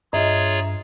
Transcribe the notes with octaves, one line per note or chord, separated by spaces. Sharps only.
G2 D4 F4 G#4 C#5 D#5 E5 A#5